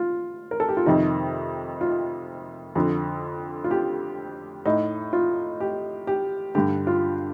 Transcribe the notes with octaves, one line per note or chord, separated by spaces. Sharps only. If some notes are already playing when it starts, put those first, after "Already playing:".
Already playing: F4
A#4
A4
G4
F4
F2 C3 D#3 D#4
F4
F2 D3
F4
G4
A2 D#4
F4
G4
G4
G2 D3 G4
F4